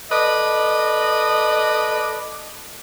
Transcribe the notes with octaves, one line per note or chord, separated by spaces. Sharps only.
A4 B4 D5 D#5